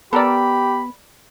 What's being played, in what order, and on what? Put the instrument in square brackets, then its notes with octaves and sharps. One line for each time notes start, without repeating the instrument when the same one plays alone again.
[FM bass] B3 [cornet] G4 [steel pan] A4 A#4 D5 [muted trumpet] B5